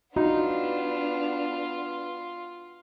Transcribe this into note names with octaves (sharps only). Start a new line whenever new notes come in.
B3 D4 D#4 F4 F#4